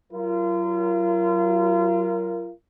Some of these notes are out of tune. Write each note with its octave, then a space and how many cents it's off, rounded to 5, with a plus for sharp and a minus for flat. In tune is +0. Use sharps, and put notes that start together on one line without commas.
F#3 +15 F4 -35 A#4 +0